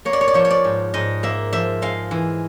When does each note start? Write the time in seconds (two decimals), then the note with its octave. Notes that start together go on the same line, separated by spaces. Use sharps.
0.05 A#3 C#5
0.13 D5
0.21 C#5
0.28 D5
0.34 F3 C#5
0.45 C#5
0.50 D5
0.64 G#2
0.94 G#2 D#5
1.23 A#3 E5
1.53 F3 E5
1.82 G#3 F5
2.11 E3